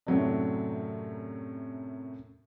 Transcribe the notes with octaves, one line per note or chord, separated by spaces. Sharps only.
F#2 A2 C3 F#3 C#4 D4